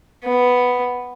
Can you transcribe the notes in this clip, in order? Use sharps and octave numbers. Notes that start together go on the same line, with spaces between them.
B3